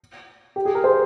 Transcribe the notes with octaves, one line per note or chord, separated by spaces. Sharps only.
G4
G#4
A#4
C5